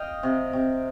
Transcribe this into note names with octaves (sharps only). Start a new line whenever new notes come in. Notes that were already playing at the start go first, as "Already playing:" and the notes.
Already playing: D#5 F5 G5
C3
C3